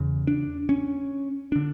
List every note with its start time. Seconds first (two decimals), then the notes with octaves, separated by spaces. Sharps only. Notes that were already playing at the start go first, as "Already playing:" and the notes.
Already playing: E2 C#3
0.27 D4
0.69 C#4
1.52 D3 D4